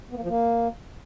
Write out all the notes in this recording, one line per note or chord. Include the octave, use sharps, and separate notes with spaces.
B3
A#3
F3
A#3